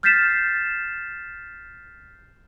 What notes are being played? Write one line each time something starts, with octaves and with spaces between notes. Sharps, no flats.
F6 G6 A6 B6 C7 E7